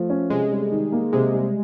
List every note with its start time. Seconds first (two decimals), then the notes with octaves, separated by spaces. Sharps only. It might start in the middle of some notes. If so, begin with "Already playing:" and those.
Already playing: F3 A3
0.10 C#4
0.30 C3 G#3
0.51 G3
0.71 D#3
0.92 A#3
1.13 C3 G#3
1.34 G3